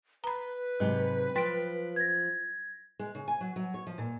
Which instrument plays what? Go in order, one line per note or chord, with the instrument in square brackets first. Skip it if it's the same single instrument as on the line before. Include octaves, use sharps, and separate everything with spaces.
[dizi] B4 [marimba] A#5 B5
[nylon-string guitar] G#2 C3 G4 [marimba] F#3
[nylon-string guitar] F3 [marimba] G5 C6 A6 [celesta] B6 D7
[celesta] G#6 A#6
[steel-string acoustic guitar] G#3
C#3
G#5
F#3
F#3
C#5
F3
A#2